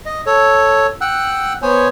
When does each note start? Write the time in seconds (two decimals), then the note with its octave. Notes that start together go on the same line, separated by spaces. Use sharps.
0.06 D#5
0.26 A4 C#5
1.01 F#5 G5 E6 F#6
1.62 B3 C5 C#5 G#5